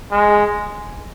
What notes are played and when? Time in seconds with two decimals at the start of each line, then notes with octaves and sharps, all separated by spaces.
0.11 G#3